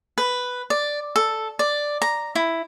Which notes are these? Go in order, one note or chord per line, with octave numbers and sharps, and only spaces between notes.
B4
D5
A4
D5
A#5
E4